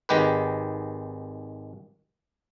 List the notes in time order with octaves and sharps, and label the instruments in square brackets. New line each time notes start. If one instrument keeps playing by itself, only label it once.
[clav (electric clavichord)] G#1 D#3 G#3 G4 B4